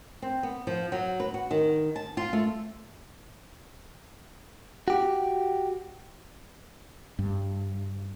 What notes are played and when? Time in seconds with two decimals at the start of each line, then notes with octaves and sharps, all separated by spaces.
0.22 C4
0.43 B3
0.67 F3
0.92 F#3
1.20 B4
1.34 F#4
1.51 D#3
1.96 A5
2.17 F4
2.33 A3
4.88 F#4 G4
7.19 G2